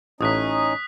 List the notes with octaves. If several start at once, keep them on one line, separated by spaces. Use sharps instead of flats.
A1 A2 C#4 D#4 D#5 D#6 F#6 B6